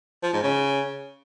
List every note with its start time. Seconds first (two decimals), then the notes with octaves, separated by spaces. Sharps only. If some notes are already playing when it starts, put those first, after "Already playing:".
0.23 F3
0.33 G#2
0.43 C#3